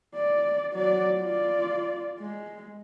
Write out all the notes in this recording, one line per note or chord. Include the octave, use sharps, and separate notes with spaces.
D5
F#3 D5
F4 D5
G#3